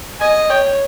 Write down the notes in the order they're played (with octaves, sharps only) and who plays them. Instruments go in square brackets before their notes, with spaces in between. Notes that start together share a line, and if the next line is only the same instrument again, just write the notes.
[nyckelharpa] D#5 [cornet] G#5
[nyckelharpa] C#5 [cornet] G5